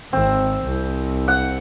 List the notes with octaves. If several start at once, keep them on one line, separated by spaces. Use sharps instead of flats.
G#1 C4
C2
F#5